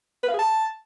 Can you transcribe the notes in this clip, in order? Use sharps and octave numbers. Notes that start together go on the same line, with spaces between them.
B4
F5
G#4
A5